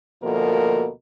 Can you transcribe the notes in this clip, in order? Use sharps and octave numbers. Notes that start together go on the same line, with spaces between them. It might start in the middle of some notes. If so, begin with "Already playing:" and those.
D2 B2 F3 A#3 A4 A#4